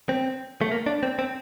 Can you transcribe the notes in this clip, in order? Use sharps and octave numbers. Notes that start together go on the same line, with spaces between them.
C4
A3
A#3
D4
C4
C4